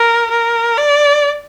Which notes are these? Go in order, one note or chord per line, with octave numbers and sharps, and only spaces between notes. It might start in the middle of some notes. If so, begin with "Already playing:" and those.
Already playing: A#4
A#4
D5